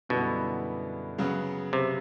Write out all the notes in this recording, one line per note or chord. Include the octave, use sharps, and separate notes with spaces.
F#2 B2 D3 G3 B3 E4
C#3 F#3 B3
C3